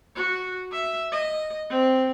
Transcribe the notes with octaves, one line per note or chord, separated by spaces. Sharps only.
F#4
E5
D#5
C4